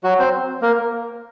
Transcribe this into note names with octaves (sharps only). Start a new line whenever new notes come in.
F#3 F#4
C4 C5
A#3 A#4